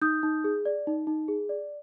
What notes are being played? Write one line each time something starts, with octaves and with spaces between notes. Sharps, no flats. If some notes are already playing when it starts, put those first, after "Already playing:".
D#4 D#6 G6
D#4
G#4
D5
D#4
D#4
G#4
D5